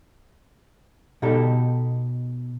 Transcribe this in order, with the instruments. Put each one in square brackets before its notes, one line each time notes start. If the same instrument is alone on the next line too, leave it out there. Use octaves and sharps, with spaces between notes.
[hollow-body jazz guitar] B2 D#4 G4 A4